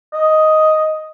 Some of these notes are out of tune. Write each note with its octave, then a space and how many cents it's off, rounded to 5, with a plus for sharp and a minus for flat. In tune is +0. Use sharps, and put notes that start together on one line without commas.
D#5 +5